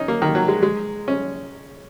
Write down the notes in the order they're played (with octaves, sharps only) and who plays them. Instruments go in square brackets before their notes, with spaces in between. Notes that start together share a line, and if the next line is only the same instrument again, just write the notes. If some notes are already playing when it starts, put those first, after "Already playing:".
Already playing: [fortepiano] C#4 D#4
A#3
D#3
F#3
G#3
G#3
C#4